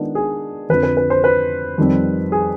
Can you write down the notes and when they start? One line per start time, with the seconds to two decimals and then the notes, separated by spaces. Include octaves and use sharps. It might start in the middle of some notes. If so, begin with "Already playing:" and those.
Already playing: D#3 G#3 B3 D4 F4
0.15 G#4
0.70 F2 D3 F3 B4
0.83 B4
0.97 B4
1.10 C5
1.24 B4
1.78 F2 D#3 G3 C4
2.32 G#4